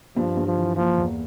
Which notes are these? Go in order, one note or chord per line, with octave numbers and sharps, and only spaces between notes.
G2 F3
G2
F3
E3
F3 A#3
E2